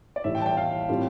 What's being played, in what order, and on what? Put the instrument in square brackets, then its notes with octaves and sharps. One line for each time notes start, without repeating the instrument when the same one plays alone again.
[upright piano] D5
[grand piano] A2 E3 G3 [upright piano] E5
[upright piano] G5
A5
G5
F5
[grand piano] A2 G3 C4 F4